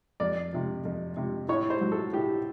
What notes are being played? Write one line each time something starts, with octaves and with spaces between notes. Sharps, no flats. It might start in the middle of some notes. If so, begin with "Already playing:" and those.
F2 D5
C3 F3
F2
C3 F3
A2 C#5
C5
F#3
A4
A2 G4